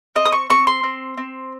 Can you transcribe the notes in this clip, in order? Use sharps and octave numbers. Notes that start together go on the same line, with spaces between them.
C4 D#5
D#6
C#6
C4 C#6
C6
C4
C4